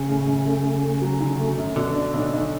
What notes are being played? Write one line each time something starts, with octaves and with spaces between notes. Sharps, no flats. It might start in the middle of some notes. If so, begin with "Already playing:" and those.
Already playing: C#3
A2
F#2
A3
A3
A3
F#3
D3
A3
F#2
B2 D3
D4
B1
B1